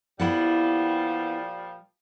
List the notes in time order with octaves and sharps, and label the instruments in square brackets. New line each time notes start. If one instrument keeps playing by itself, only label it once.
[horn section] A#2 F3 G3 [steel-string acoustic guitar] B3 E4 F#5